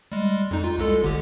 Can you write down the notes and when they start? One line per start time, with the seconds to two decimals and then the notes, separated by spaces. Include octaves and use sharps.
0.12 G3 G#3
0.51 F2 D#4
0.64 F4
0.78 C2 G#3 A4
1.03 G1 D3 G4